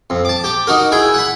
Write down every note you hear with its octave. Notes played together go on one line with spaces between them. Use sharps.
F2
A5 D6
G4 D6
D#4 F#4 A#4
E4 G#4 G5
F#5 B5